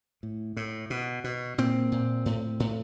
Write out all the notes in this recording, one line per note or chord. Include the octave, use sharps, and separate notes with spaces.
A2
A2
B2
B2
A#2 C4
A#2
A2
A2